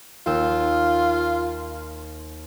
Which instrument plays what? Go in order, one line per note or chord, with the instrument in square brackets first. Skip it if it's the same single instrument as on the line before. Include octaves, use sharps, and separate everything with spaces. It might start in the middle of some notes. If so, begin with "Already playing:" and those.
[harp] D#2 G5 E6 [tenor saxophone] F4